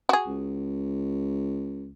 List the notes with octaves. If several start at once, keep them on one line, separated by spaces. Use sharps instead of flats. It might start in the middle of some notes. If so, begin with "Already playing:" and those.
F#4 G#4
C#2